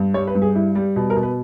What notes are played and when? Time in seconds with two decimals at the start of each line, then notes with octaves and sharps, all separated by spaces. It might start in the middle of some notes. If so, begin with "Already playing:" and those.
Already playing: G2
0.14 G3 C#5
0.27 B4
0.35 G2
0.42 G#4
0.55 G3 E4
0.75 G3
0.96 B2
1.10 A#4
1.16 B2
1.23 B4